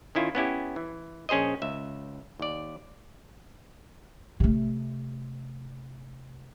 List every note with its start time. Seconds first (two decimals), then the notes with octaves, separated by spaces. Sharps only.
0.15 D#3 C#4 E4 F4
0.35 B3 C#4 E4 G4
0.76 E3
1.29 A#1 C#4 G#4 C5 D#5
1.62 C#2 E5
2.39 D#2 D5
4.40 C3 A3